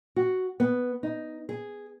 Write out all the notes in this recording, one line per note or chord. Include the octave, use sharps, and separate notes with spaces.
F#4
B3
D#4
G#4